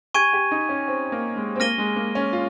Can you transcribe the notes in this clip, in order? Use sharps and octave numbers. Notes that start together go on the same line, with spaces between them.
G4 G#5 C#6 G#6 D#7
G4
D#4
C#4
C4
A#3
G#3
C4
A#3 F6 A#6 D#7 G7
G#3
A#3
C#4
F4